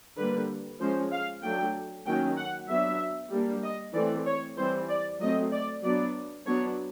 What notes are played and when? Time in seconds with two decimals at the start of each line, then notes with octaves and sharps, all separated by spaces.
0.17 D3 G3 A#3 B4
0.80 F3 G#3 C#4 C5
1.12 F5
1.43 F#3 A3 D4 G5
2.06 D#3 F#3 A#3 C#4 G5
2.37 F#5
2.69 F#3 B3 D4 E5
3.32 G3 A#3 D4
3.63 D#5
3.94 E3 A3 C4 D5
4.26 C#5
4.57 E3 G3 C4 C5
4.89 D5
5.21 F#3 A3 C4 D#5
5.52 D5
5.83 F#3 B3 D4 D5
6.46 F#3 B3 D4 C#5